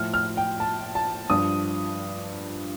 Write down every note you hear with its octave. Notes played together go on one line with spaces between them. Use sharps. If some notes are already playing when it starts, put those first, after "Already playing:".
Already playing: A2 F3 F6
F6
G5
A5
A5
G2 F3 D#6